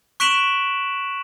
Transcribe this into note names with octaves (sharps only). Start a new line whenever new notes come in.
C#6 F#6 B6 D7 E7 F#7